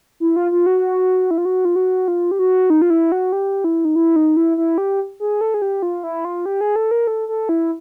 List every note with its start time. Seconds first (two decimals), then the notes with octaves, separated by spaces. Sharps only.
0.20 E4
0.36 F4
0.52 F4
0.66 F#4
1.31 E4
1.38 F4
1.45 F#4
1.65 F4
1.76 F#4
2.08 F4
2.31 G4
2.39 F#4
2.70 D#4
2.82 F4
2.90 E4
3.12 F#4
3.32 G4
3.64 E4
3.85 D#4
3.96 E4
4.16 D#4
4.37 E4
4.57 E4
4.78 G4
5.20 G#4
5.41 A4
5.54 G#4
5.62 G4
5.82 F4
6.03 E4
6.25 F4
6.46 G4
6.61 G#4
6.76 A4
6.91 A#4
7.07 A4
7.29 A4
7.49 E4